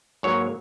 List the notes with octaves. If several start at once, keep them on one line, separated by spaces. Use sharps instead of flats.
G#2 F#3 A#3 C#5